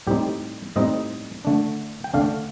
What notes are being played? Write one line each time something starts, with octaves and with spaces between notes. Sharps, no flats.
A2 G3 C4 D#4 G4
A2 G3 C4 D#4 D#5
D3 A3 D4
G5
D3 A3 D4 F5